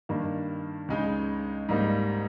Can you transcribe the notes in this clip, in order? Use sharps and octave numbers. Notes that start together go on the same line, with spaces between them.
G2 D#3 A#3
C#2 C#3 G#3 D#4
G#2 G3 A#3 D#4